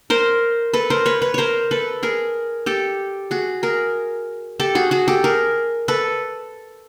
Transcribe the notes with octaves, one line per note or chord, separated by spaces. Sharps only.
A#4 C5
A4 B4
A#4 C5
B4 C#5
B4 C#5
A#4 C5 C#5
A4 B4
G#4 A#4
G4 A4
F#4 G#4
G#4 A#4
G4 A4
F#4 G#4
F#4 G#4
G4 A4
G#4 A#4
A4 B4